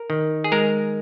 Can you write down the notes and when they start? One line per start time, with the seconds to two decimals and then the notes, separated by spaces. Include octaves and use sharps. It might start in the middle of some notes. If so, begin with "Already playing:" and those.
Already playing: A#4
0.10 D#3
0.44 G#4
0.52 G#3 A#4